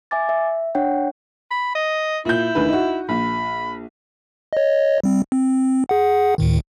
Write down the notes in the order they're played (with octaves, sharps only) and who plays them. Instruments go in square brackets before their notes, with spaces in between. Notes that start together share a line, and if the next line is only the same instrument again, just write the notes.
[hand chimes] E5 G#5 D6 A6
E5
D4 C#5 F#5 G5
[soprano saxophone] B5
D#5
[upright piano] A#2 G6 [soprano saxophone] E4
[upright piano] D2 D#3 B4
D#4 F#4
[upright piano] A#1 [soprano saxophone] B5
[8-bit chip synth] C#5 D#5
G3 C4
C4
G#4 F#5
D2 A2 D#3